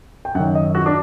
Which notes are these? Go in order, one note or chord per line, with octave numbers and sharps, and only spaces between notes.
G5
F#2 D#3 F#5
D#5
F#4
D4